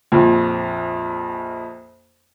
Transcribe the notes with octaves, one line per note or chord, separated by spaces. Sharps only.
A#1 F2